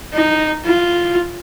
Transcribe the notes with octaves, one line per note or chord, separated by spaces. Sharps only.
D#4
F4